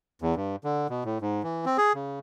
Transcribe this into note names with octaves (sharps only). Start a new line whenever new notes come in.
E2
G2
D3
B2
A2
G#2
E3
C4
G#4
C#3